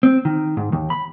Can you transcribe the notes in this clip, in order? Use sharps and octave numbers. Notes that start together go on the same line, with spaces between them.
C4
D#3
G#2
D#2
B5